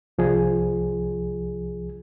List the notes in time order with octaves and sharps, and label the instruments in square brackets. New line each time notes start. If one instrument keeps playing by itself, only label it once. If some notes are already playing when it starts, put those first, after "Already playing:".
[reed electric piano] C2 F3 G#4